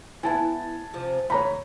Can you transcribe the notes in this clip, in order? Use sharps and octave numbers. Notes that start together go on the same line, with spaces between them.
B3 E4 G#5 A5
C3 F3
D2 G#2 C#5 A#5 B5